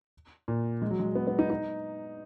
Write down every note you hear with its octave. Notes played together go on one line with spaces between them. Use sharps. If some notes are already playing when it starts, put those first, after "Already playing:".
A#2
G#3
F#3
G#3
B3
B3
D#4
D#4